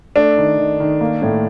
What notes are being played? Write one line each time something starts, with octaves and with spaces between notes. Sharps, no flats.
A3 D4
D#3
D#3
D#3
A#3
A2